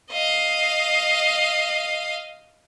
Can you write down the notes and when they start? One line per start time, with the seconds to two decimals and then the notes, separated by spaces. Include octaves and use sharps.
0.11 D#5 F5